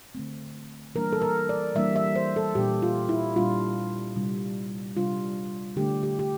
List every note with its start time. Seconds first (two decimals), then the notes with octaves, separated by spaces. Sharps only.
0.15 D3 A3 C4
0.95 E3 G3 A#3 D4 A#4
1.13 A4
1.22 A#4
1.49 D5
1.75 E3 G3 A#3 D4 E5
1.96 E5
2.15 C5
2.36 A4
2.55 A#2 G3 A#3 D4 G4
2.82 F4
3.09 E4
3.36 A#2 G3 A#3 D4 F4
4.16 C3 G3 D4
4.97 C3 G3 D4 F4
5.77 D3 A3 D4 G4
6.03 G4
6.19 G4